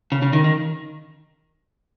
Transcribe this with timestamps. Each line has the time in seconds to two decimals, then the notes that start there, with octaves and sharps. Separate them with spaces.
0.12 C#3
0.22 C#3
0.33 D#3
0.44 D#3